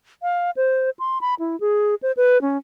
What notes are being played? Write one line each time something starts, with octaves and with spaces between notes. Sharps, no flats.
F5
C5
C6
B5
E4
G#4
C5
B4
C#4